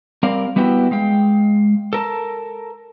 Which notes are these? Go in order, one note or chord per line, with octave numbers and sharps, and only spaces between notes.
G3 C4 A#4 D5 F5
G3 B3 E4 F#4 G5
G#3 F5 G5
A4 A#4 A5